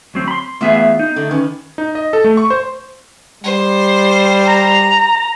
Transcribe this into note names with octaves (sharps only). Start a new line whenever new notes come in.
D2 F#3 C4
B5 C6
E3 A3 B3 F4 G#4 E5
D#4
D3 A3
D#3 C#4 B4
D#4
D#5
A4
A3
C#6
C5
G3 C5
A#5